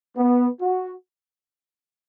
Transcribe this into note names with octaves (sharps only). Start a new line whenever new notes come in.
B3
F#4